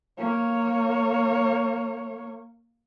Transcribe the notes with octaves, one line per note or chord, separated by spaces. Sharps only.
A#3 C#5